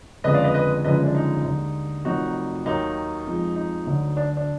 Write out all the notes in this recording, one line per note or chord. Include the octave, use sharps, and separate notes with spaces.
F#1 F2 D3 G#3 B4 D#5
D5 F5
B4 D#5
B4 D#5
F#1 F#2 D3 F3 G#3 B4 D#5
D4
D#4
D#2 D3 G#3
F1 F2 D#3 F#3 D#4 F#4
D#2 D#3 F#3 D#4
F2 F3 G#3
D#4
D2 D3 F#3
D4
D4